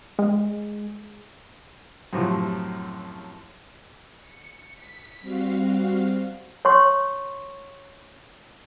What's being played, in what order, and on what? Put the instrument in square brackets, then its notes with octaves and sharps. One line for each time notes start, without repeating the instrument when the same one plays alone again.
[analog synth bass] G#3
[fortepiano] F#2 A2 C3 F3
[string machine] C#7
B6
G3 C4 F#4 F5
[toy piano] C#5 C6 C#6